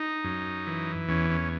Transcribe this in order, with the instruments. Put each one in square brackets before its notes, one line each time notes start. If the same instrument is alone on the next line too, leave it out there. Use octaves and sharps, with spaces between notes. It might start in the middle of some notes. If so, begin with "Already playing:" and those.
Already playing: [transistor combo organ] D#4
F#2
E3
E2 C#4
C#4